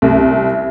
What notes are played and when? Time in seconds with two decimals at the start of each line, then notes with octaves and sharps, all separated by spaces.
0.02 C2